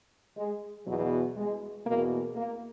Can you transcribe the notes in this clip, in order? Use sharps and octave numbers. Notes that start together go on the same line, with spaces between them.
G#3
E2 B2 F#3
G#3
E2 B2 A#3
A#3